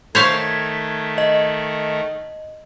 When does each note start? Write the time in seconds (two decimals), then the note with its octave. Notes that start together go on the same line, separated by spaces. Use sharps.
0.15 D#3 A3 C5 C#5 F5 G#6 B6
1.18 D#5